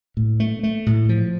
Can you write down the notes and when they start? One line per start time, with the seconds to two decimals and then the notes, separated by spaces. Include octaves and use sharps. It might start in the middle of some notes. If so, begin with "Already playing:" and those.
0.17 A2
0.40 A3
0.63 A3
0.86 A2
1.09 F3